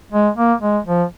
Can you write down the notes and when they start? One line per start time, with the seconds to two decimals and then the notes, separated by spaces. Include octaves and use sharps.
0.12 G#3
0.36 A#3
0.61 G#3
0.86 F3